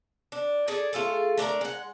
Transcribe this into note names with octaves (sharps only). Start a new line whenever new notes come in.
D4
G#4 A4 D5
A3 F4 G#4 A4
A3 D4 A4 A#4
G#3 F#5